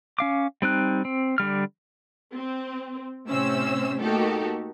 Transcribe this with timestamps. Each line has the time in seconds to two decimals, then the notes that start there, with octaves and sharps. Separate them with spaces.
0.19 C#4 F5 D6
0.62 G3 C4 D#4 F#6
1.05 C4
1.38 D3 G3 F6
2.34 C4
3.26 A2 C3 C#4 C5 E6
4.00 A3 A#3 D#4 F#4 G4 A4